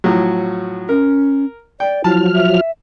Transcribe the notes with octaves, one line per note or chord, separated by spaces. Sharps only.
A2 F3 F#3
C#4 A#4
D5 G5
F3 F#3 E4 A5 F6
E5